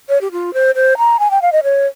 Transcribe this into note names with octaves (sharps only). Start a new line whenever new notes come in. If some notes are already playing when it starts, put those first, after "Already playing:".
C#5
G4
F4
C5
C5
A#5
G#5
G5
F5
D#5
C#5